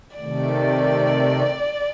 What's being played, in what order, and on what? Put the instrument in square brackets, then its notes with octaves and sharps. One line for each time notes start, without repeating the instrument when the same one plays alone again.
[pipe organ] C3 D#3 A3 [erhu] D5